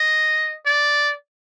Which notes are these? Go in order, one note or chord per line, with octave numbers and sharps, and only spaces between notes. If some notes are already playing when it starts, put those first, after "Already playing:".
Already playing: D#5
D5